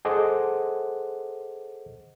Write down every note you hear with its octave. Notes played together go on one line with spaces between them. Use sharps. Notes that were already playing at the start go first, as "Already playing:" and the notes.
G#4 A4 C5 D#5 F#5 D6